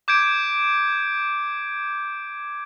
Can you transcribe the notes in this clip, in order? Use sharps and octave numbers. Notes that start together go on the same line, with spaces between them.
D6 G6 G#6 D7